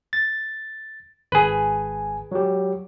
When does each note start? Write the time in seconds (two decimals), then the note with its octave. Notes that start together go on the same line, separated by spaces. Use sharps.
0.13 A6
1.32 G#1 G#4 B4 G#5
2.32 F#3 G4